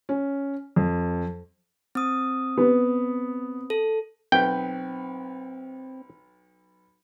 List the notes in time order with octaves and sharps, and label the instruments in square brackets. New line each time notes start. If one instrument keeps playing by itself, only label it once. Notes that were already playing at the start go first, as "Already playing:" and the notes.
[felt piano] C#4
F2
[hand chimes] C4 D#6
[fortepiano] B3
[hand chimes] A4
[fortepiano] B1 B4 [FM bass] C4 [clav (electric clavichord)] G5